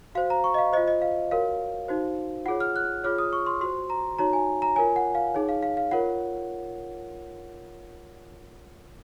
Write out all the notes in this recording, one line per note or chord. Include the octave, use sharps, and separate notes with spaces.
F#4 C5 F5
A#5
C#6
D#5
F5
F4 C5 D#5
D#5
F5
F#4 A#4 C#5 F5
D#4 F#4 C5
F4 G#4 C#5 F#5
F6
F#6
F4 G#4 C#5 F6
D#6
C#6
C6
F#4 C5 C6
A#5
D#4 F#4 C#5 A#5
G#5
A#5
F4 A#4 C#5 G#5
F#5
F5
D#4 G#4 C#5
F5
F5
F5
F4 A#4 C#5 F#5